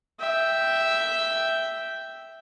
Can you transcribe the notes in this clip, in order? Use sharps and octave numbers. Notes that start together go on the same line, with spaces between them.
E5 G5